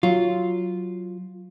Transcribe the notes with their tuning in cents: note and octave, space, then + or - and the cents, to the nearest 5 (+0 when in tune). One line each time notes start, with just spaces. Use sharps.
F#3 +0 F4 +0